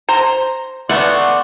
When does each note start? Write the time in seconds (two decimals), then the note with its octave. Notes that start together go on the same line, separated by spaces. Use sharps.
0.09 C5 A#5
0.89 E3 A3 B3 D5 F#5 C6 C#6